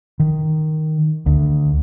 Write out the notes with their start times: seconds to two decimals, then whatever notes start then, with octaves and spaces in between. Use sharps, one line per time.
0.20 D#3
1.26 D2